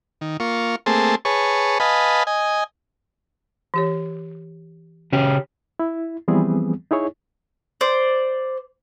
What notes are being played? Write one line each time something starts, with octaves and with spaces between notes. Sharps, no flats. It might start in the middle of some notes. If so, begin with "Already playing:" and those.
D#3
A#3 F4 C#6
A3 A#3 C4 G#4 A5 C6
G#4 B4 C#5 A5 C#6
B4 D#5 F5 G#5 A5 B5
D#5 G#5
E3 G4 C#5
C#3 C#4 G4
E4
E3 F3 G3 B3 C4 G#4
D#4 E4 G#4 C#5
C5 D5